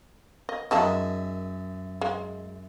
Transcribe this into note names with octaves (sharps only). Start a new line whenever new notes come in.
D#5
F#2 D#3 G#3 E5 A5 D#6
G#3